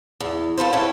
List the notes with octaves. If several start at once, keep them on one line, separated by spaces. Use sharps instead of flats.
E2
F4 A4 B4 C5
C#4 E4 A4 B4 E5 G5